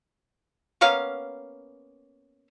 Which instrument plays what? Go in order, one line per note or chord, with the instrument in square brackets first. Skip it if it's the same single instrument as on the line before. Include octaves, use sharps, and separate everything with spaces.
[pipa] A#3 B3 C#4 F5